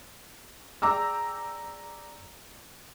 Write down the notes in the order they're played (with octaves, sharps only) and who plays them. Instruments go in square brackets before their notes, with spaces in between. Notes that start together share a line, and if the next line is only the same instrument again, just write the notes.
[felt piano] G#4 D5 G5 A#5 D6 E6